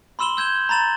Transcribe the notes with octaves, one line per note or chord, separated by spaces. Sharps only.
B5 C6 E6 E7 F#7 G7
E6 G6 G#6 E7 G7
A#5 B5 A6 E7 F#7